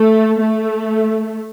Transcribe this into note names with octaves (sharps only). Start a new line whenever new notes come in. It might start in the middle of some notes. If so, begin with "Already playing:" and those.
Already playing: A3
A3